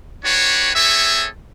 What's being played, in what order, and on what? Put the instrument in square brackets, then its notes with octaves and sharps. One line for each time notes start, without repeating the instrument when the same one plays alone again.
[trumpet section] D4 F#4 G4 B4 C#5
C4 G#4 A4 C#5 E5